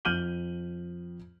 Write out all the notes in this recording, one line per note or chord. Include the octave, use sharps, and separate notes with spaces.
F2 F6 G6 D#7 F#7 G7